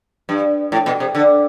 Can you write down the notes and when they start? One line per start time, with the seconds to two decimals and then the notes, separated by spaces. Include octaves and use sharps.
0.29 G2
0.72 A2
0.86 B2
1.00 C3
1.15 D3